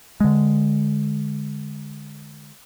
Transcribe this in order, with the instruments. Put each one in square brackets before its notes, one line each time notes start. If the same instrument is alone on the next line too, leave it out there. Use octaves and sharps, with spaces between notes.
[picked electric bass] D3 G#3